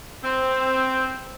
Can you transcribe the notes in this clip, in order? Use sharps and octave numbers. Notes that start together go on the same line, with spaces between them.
C4